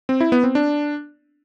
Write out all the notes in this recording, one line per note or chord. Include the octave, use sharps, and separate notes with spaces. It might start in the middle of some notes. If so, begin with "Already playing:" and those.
C4
E4
B3
C4
D4